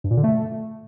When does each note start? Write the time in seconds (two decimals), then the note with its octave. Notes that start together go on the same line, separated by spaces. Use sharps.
0.04 G2
0.11 A#2
0.17 D3
0.24 A3